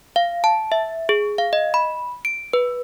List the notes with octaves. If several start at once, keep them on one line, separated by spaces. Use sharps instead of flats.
F5
A5
E5
G#4
F5
D#5
B5
D7
B4